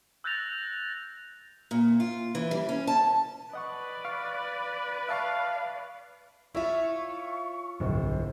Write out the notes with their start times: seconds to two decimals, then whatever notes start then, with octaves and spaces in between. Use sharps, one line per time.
0.24 E6 F#6 G6 A6 A#6 F7
1.71 A#2
2.00 F4
2.35 E3
2.51 G3
2.69 C#4
2.87 A5
3.54 B4 D5 D#5 F#5 C#6
4.05 F5 C#6
5.09 E5 F5 A5 C#6
6.55 E4 F4 C#5 E5 C#6
7.80 D1 B1 G2 C5